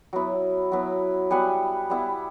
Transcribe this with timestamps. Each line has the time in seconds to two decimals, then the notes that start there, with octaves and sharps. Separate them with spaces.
0.13 F#3 B3 E4
0.72 F#3 B3 E4
1.31 G3 B3 E4 F#5 G#5
1.90 G3 B3 E4